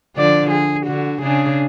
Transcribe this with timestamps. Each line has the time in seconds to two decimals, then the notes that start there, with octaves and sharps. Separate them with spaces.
0.17 D3 F3 D5
0.51 G#4
0.86 D3 F#4
1.22 C#3 D4 G#4